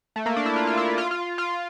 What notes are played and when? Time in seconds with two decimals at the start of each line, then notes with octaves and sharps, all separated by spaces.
0.16 A3
0.26 A#3
0.36 D4
0.46 E4
0.56 F4
0.67 F4
0.77 E4
0.98 F4
1.11 F4
1.38 F4